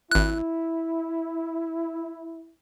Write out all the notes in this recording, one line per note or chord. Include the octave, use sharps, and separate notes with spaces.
G#1 E4 F#6